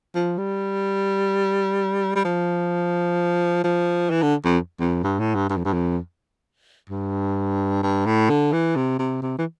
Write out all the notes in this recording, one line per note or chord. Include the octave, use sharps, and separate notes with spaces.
F3
G3
G3
F3
F3
E3
D3
F2
F2
G2
A2
G2
G2
F2
G2
F2
G2
G2
A2
D3
E3
C3
C3
C3
E3